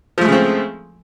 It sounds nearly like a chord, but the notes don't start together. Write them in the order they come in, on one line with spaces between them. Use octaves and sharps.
F3 A3 G#3 C#3 C4